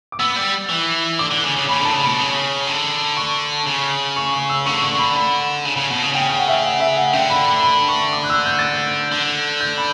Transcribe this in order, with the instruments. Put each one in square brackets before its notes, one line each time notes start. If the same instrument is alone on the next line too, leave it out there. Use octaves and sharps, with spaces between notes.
[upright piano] D6
[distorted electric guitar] B3 [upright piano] E6
[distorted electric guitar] G3
E3
[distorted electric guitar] D3 [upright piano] D6
[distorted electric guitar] D3
C#3
C#3
[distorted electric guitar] C#3 [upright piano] B5
[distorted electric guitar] D3 [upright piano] A5
[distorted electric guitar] C#3
[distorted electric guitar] B2 [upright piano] B5
[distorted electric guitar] C#3
D3
[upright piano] C#6
[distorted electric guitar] C#3
[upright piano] C#6
C#6
E6
[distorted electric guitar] D3 [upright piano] C#6
[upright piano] C#6
B5
B5
[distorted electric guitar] C#3
C#3
B2
C#3
[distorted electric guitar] C#3 [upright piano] G5
[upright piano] G5
F#5
E5
F#5
E5
F#5
[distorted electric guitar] D3 [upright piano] G5
[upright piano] B5
B5
B5
C#6
D6
F#6
E6
G6
A6
G6
[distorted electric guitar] D3
[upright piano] G6
B5